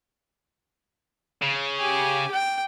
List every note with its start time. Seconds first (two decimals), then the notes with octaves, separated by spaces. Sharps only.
1.42 C#3
1.79 G4 G#5
2.31 G5